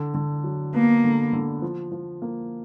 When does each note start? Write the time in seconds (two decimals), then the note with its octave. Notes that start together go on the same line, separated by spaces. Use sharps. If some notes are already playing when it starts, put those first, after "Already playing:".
Already playing: D3
0.14 D3
0.44 F#3
0.74 A#3 B3
1.04 D3
1.33 D3
1.62 F3
1.92 F3
2.22 A#3